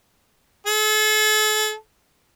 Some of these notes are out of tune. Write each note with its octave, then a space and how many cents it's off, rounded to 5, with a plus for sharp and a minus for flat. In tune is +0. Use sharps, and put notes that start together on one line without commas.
A4 -40